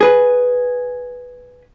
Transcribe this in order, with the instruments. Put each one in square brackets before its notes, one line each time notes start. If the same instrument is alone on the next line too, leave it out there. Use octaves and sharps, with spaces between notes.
[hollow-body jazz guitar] G#4 B4